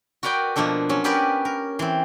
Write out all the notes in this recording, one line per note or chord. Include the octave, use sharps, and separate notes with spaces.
F#4 A#4 B4 D5 G5
B2 F3 A#3 D4 A4
F#3 C#4
B3 C#4 G4 A#4 B4 D5
A#4
E3 C4